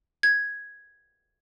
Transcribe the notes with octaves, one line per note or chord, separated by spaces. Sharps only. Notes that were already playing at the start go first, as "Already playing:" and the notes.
G#6